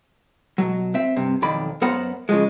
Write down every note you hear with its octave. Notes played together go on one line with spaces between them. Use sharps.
B2 F#3
C4 E5
G2 C3
B1 F2 D#3 D5 B5
F#2 B3 A#4 C5 F#5 B5
C#3 F3 G#3